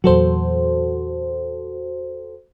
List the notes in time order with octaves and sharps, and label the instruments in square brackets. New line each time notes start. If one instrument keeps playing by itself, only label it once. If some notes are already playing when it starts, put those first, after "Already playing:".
[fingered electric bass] E2 A#2 F#3 [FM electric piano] F#4 A4 C5